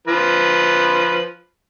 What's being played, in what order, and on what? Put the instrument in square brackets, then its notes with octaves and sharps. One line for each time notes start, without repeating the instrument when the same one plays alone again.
[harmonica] F3 B4